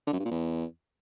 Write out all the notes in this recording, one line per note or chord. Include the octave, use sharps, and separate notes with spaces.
D3
F#2
G2
A#2
E2